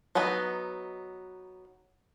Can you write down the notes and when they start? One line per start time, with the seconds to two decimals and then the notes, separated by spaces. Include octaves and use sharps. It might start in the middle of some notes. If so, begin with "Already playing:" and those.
0.15 F#3 B3 D#4 B4